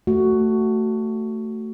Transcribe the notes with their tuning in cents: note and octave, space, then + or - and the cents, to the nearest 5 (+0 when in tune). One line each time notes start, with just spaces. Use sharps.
A3 +15 F#4 +10